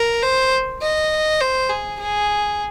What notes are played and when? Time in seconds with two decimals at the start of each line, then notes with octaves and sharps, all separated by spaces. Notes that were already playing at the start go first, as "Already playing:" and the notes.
Already playing: A#4
0.22 C5
0.82 D#5
1.40 C5
1.69 G#4
2.00 G#4